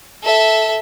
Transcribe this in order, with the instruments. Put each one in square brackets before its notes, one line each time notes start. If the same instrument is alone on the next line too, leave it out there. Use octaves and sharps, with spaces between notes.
[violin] A4 E5